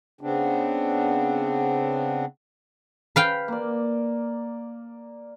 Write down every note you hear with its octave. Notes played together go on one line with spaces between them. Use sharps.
C#3 B3 C4 D4
B4 F5 G5
A#3 D5